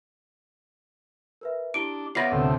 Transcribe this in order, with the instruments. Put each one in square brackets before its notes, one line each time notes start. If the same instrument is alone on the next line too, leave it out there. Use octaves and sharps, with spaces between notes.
[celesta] A#4 B4 E5
[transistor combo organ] D4 [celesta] E4 G4 G7 [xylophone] D7
[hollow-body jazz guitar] B3 F4 B5 [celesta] C#5 E5 [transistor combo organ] D5 [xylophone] A#6 C7
[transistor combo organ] D2 A2 C3